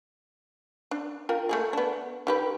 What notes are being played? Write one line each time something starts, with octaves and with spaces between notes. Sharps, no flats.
D4
F4 A#4 G5
A3 A#3 G#4
B3 D4
D#3 G4 B4